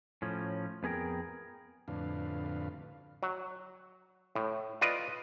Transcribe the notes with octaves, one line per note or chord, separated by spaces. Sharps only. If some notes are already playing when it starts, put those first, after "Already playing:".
A2 F3 C#4
F2 B3 G#4 A#4 G5
F2 A2 D3 D4 B4 F5
F#3
A2
F4 B4 D5 D#5